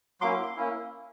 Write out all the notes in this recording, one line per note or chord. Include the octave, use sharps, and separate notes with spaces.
F#3 A#3 C#4 E4 C6 D6
A#3 C#4 E4